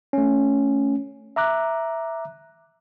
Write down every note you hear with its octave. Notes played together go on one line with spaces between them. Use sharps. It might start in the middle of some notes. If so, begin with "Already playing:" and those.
A3 C#4
E5 A#5 D6 F#6